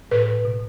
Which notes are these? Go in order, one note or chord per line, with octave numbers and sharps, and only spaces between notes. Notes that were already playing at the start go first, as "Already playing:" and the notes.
A2 B4
A2
B2